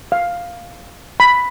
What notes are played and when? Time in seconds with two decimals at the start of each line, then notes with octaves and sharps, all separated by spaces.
0.12 F5
1.20 B5